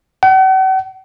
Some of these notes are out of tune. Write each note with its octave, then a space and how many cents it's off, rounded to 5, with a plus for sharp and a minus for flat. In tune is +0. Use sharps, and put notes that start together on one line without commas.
F#5 +45